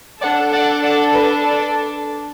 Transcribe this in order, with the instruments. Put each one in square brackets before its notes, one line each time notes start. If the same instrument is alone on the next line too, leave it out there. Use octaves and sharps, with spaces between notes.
[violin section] D4 A4 D5 F#5
D5 F#5
D5 F#5
B4
A4 D5